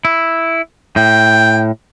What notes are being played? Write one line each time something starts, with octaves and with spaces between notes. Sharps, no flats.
E4
A2 G5